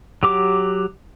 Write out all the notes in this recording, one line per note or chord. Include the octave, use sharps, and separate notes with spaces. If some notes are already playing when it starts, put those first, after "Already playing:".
F#3 G4 D6